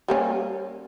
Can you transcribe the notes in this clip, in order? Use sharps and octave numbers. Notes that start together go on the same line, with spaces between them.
G3 A#3 C#4